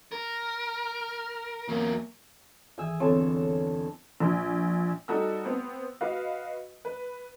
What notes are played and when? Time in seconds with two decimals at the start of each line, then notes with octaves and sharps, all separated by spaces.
0.12 A#4
1.68 E2 F#3 A#3
2.78 G#1 E3 G#4 E5 G#5 E6
3.00 G1 E2 D3 C4 A4 C#5
4.20 A#1
5.08 G3 D#4 F#4 A4 E6
5.45 B3 C4
6.01 F#4 B4 D#5 F5
6.85 B4